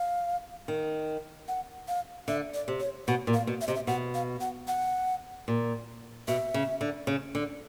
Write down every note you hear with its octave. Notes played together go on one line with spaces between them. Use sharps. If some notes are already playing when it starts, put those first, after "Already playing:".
Already playing: F5
D#3
F#5
F5
D3 E5
D5
C3
C#5
B2 F#5
A#2
F5
B2
E5
C3 D#5
E5
B2 F#5
F5
F#5
F#5
A#2
B2 E5
C#3
D3
C#3
D3